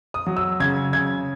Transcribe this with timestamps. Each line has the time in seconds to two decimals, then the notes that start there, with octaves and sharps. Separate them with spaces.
0.14 D#6
0.26 F#3
0.37 E6
0.60 C#3 G#6
0.93 C#3 G#6